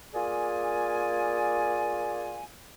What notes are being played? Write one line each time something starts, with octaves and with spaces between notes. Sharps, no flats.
A#3 F4 G#4 D5 G#5